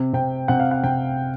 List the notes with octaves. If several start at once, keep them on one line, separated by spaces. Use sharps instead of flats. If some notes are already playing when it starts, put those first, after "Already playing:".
Already playing: C3
C3 G5
C3 F#5
F5
F#5
C3 G5